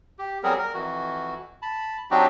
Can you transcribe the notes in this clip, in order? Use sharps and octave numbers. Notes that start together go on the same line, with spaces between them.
G4
F#3 G3 B3 C4 G#4 A#4
A#4
F2 E3 F#4
A5 B5
F#3 C4 D4 D#4 F#4 G4